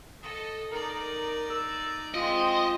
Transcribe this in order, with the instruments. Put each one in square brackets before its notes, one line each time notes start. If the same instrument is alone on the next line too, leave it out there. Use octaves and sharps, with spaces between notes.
[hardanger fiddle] A4 D#5 [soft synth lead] D#6
[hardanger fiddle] D#4 D5 [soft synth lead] A#4
[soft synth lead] E6
[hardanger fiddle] G#3 C4 [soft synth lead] F4 [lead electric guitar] D#5